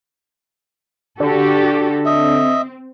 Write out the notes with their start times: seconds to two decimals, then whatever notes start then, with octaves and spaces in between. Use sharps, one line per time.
1.20 D3 F#4 G4 A4
2.06 C4 D#5 E5